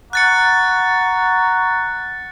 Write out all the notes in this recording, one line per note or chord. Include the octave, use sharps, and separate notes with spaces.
F#5 A#5 C#6 F#6 A6 C#7